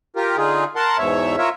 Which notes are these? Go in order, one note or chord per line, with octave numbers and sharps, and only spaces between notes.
F4 G4 A#4
D3 D#4 F4 G#4
A#4 F#5 A5 C6
E2 G#2 B2 C#5 E5
F4 A#4 C#5 E5